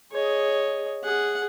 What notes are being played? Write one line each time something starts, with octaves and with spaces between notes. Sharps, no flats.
G#4 C#5 D#5
G#4 F#5